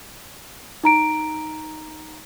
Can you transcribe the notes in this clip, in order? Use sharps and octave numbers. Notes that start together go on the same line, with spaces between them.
D#4 A#5 D7